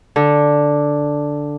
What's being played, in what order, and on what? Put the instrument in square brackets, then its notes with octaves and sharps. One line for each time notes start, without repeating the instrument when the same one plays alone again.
[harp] D3